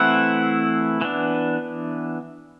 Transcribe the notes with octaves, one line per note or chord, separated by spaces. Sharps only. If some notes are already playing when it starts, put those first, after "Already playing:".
Already playing: E3 A3 C4 E4 F#5
E3 B3 D4